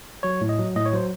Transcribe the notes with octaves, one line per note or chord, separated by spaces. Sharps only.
F#3 C#5
A2
D#5
F#3
A2 D#5
C#5
F#3 C5